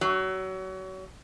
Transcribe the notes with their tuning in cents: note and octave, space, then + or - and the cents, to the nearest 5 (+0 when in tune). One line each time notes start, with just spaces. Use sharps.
F#3 +30